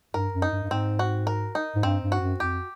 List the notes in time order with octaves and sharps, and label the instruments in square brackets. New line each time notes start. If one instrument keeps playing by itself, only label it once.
[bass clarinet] G2 [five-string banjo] A#4
[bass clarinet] F#2
[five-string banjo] D#4
[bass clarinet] G2
G2
[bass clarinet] G#2 [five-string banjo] C4
[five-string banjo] F#4
A#4
D#4
[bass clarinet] G#2
[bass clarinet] G2 [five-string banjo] C4
[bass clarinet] G2
[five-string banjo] F#4
[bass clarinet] F#2
[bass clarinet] F2 [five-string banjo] G4